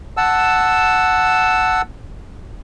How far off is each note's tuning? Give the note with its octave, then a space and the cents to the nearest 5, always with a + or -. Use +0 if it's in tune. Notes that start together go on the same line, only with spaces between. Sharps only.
F#5 +0 A5 +0 E6 +0